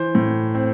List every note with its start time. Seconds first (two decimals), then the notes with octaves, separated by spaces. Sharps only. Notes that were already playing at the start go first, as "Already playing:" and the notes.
Already playing: E3 C5
0.15 A2
0.55 C4